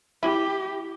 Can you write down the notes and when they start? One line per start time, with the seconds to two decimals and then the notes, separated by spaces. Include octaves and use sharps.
0.23 E4 G4